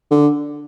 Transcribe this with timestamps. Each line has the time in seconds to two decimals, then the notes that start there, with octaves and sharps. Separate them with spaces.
0.11 D3